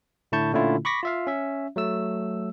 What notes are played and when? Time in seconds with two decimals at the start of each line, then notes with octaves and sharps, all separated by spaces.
0.32 A2 D3 E4 A5 C#6 G6
0.53 A#2 D3 A3 C#4 E4 F4
0.85 B5 C#6 D6 A#6 B6
1.03 F4 E5 F5
1.27 C#4 E5
1.76 F#3 A3 E6